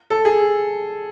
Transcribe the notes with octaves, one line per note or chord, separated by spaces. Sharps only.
A4
G#4